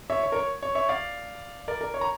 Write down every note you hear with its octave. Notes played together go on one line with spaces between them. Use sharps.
C#5 E5
C#5
A#4
C#5
C#5
C#5 E5
D5 F5
A#4 D5
A#4
C#5
A#5